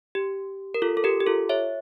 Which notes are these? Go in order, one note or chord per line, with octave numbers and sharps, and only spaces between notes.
G4
A#4
F4 A4
A4
G4 A#4
G4
F4 A4
C#5 E5